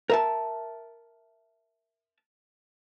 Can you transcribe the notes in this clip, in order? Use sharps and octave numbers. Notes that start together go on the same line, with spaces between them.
A#4 E5 A5